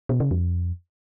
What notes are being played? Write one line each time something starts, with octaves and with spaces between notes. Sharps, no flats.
B2
C#3
F2